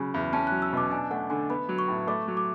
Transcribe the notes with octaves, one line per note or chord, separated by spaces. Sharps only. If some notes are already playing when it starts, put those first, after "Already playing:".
Already playing: C#3 F#3 G#5 B5
E2
C#4 A5
F#3 F#6
E6
B2 D6
D4 G#5
A3 F#5
D3 G#5
B3 B5
F#3
C#6
A2
A3 D6
F#3
D6